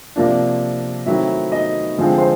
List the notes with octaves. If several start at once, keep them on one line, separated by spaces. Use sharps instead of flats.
C3 F3 A#3 D4
D#3 F#3 A3 C4 E4 E5
D#4 D#5
D3 F3 G#3 C4
C5